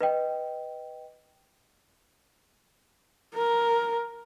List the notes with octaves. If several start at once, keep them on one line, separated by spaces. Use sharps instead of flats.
B4 D#5 G5
A#4